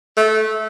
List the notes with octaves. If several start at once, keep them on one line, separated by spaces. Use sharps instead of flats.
A3